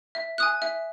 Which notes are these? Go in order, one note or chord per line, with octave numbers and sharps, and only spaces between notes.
E5
G#5 D#6 F#6
E5